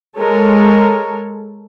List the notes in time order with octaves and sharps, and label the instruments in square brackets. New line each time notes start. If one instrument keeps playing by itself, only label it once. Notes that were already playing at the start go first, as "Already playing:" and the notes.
[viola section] G#3 A4 A#4 C#5